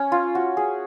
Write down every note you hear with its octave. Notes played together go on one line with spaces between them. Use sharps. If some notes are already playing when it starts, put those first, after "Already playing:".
Already playing: C#4
F4
F#4
G#4